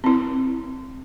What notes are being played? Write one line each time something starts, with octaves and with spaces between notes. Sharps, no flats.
C4 E4